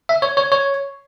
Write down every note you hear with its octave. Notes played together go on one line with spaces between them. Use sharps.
E5
C#5
C#5
C#5